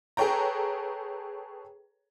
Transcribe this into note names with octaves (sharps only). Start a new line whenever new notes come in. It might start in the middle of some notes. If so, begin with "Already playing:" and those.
G#4 A4 B4 C#5 G5 A#5